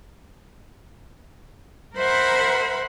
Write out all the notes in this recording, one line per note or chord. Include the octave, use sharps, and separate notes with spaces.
A#4 C5 E5 F#5 B5 C6